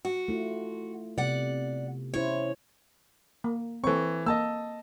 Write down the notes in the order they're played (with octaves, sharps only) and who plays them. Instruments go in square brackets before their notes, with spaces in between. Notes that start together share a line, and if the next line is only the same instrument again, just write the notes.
[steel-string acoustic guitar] F#4
[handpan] A3 E4 F4
[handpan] C3 B3 [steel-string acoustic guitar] D5 F#5
[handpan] C#4 E4 C5 [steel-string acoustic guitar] C#5
[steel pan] A#3
[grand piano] E3 C#6 [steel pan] C4 A4
[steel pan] A#3 [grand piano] D#5 A5 E6